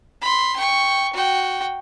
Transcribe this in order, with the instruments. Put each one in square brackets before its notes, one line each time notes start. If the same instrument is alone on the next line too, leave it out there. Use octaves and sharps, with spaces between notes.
[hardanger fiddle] B5 C6
G5 C#6
F#4 G5